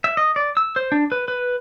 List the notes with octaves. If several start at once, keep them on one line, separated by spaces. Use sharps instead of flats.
E5
D#5
D5
E6
C5
D4
B4
B4